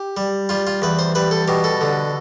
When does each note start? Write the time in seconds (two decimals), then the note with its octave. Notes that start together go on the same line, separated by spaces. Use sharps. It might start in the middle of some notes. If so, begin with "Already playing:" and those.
Already playing: G4
0.17 G3
0.49 G3 F4
0.67 F4
0.82 E2 B4
0.99 C5
1.15 G3 B4
1.31 A4
1.48 B2 G4
1.64 A4
1.81 D3